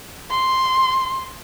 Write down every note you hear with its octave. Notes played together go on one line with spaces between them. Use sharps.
C6